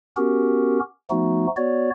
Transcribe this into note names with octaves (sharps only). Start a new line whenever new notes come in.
B3 C#4 F#4 G4 A#4
F3 A3 B3 D#4 F#4
B3 F#4 C#5 D5